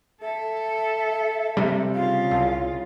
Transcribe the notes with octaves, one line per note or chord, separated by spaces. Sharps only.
A4 E5
C3 G3
C#3 F4 F5
C2